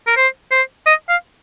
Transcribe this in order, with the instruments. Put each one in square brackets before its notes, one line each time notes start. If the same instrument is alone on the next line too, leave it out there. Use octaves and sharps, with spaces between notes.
[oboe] A#4
C5
C5
D#5
F5